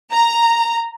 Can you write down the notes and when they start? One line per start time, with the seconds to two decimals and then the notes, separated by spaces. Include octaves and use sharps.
0.12 A#5